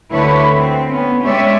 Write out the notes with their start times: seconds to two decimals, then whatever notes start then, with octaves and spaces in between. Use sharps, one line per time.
0.12 D2 D3 E4 B4 C#5
0.55 C4
0.90 B3 C#4
1.23 G#3 C#4 G4 C#5 D5 E5